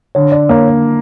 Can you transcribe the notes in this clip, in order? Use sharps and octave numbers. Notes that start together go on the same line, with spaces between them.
D3 C#5
D5
A#3 C#5